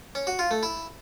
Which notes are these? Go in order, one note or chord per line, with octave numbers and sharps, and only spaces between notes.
C#4
F#4
F4
A3
E4